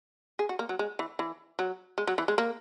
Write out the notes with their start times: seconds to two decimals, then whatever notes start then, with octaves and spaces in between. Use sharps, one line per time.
0.39 G#4
0.49 F#4
0.59 A#3
0.69 F#3
0.79 G#3
0.99 E3
1.19 E3
1.59 F#3
1.98 G#3
2.07 F#3
2.18 E3
2.28 G#3
2.38 A#3